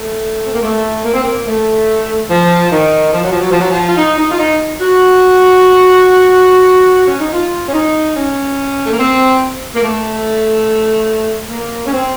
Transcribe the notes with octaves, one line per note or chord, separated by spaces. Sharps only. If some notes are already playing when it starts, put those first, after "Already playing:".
Already playing: A3
C4
A#3
A3
A#3
C4
A#3
A3
F3
D#3
F3
F#3
F3
F#3
F3
F#3
F3
F4
D#4
D#4
F4
D#4
F#4
C#4
D#4
F4
C#4
D#4
C#4
A3
A#3
C4
A#3
A3
A#3
C#4
C4